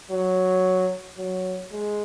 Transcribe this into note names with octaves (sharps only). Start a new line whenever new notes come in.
F#3
F#3
G#3